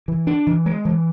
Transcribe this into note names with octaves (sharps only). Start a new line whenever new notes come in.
E3
D4
E3
G#3
E3